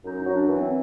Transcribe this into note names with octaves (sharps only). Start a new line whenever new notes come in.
F#2 D#4
D#4
F#3
D4
E3
C4